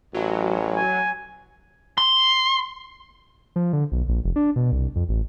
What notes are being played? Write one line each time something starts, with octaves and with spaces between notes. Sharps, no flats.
A1 F#3
G#5
C6
F3
D3
B1
A#1
F1
D4
B2
C2
F2
A1